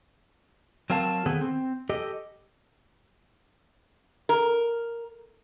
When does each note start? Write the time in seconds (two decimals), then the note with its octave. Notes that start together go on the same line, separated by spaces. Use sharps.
0.90 F#3 C4 A#4 F5 A5
1.26 D#3 B3 C4 G#4 A4
1.41 C4
1.89 G4 A4 D#5
4.29 A#4